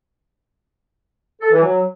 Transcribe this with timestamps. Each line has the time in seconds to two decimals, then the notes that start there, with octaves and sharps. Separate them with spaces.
1.41 A4
1.52 E3
1.63 F#3